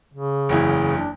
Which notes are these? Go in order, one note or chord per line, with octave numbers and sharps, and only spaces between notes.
C#3
F#1 E2 E4
D4